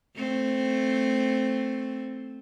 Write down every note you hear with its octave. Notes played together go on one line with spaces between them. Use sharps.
A3 C4